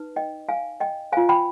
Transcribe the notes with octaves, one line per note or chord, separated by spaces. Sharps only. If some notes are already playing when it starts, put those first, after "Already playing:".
Already playing: D#4 B4
D#5 G5
F5 G#5
D#5 G5
F4 C5 F5 G#5
G5 B5